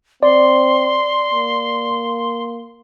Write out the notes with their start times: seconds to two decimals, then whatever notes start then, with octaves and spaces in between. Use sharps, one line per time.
0.23 C4 D5 C6
1.32 A#3